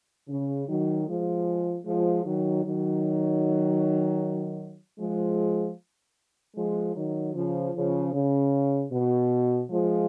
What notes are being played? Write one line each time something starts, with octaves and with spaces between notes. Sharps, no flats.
C#3
D#3 F#3
F3 G#3
F3 G#3
D#3 F#3
D#3 F#3
F3 G#3
F3 G#3
D#3 F#3
C#3 F3
C#3 F3
C#3
B2
F3 G#3